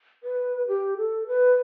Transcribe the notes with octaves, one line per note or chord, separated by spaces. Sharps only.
B4
G4
A4
B4